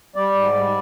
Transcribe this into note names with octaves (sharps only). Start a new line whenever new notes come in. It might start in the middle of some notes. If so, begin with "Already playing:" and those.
G3 D5
G#2
G3